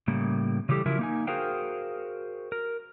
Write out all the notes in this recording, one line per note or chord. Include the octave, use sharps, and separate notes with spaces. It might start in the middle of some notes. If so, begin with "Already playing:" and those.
A2 C#3 G3 A#3
C#3 E3 G3 G4 A4
C#3 F3 F#3 E4 A#4
A#3 D#4 G#5
F#4 G#4 A#4 C5 F5 G5
A#4